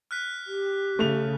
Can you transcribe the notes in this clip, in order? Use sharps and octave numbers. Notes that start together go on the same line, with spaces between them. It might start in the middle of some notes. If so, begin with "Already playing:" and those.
F6 F#6 B6
G4
C#3 A3 F7